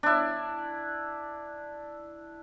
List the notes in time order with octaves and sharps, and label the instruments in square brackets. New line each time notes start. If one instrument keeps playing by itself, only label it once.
[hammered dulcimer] D4 E4